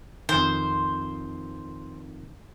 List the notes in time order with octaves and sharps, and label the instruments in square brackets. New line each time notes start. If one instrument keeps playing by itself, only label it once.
[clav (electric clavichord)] F2 D#3 [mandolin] C5